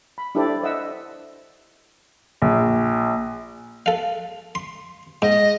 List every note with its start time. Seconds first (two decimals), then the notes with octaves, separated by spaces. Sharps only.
0.18 B5
0.35 D4 E4 G4 A4 C5 D5
0.63 C5 D#5 E5 F#5 E6
2.42 A#1
3.86 A4 F5
4.55 C6
5.22 G#2 D#5